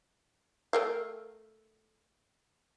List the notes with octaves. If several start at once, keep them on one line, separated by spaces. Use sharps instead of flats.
A3 A#4 F5